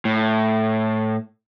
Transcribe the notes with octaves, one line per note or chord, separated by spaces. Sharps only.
A2